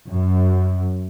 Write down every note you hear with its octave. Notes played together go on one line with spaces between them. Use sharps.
F#2